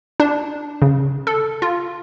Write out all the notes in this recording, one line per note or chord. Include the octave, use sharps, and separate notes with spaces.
D4
C#3
A4
F4